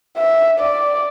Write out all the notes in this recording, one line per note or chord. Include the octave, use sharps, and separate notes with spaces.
E5
D5